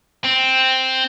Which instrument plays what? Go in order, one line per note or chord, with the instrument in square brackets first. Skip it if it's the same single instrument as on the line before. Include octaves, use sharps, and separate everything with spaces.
[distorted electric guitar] C4